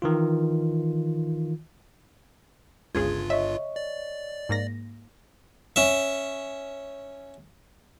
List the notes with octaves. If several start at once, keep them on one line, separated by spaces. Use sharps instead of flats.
D#3 E3 F4
G1 C#2 G2 C#3 F4 G#4 G#6
C#5 D#5 E5 C#6
D5
G#2 A#3 A#6
C#4 E5